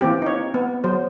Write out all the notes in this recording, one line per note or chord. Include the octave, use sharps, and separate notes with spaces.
E3 A#3 C4 G4
D#4 C#5
B3
F#3 C5